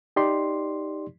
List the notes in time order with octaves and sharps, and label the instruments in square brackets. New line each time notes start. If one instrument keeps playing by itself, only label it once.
[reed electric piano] D#4 G4 D5 C6